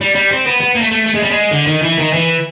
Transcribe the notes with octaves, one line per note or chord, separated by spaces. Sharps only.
G3
G3
C4
B3
B3
A#3
A3
A3
A3
G#3
G3
G#3
D3
D#3
E3
D#3
E3